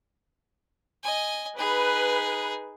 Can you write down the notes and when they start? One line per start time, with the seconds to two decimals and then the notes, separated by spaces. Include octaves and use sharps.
1.03 D#5 G#5
1.58 D#4 G#4 B4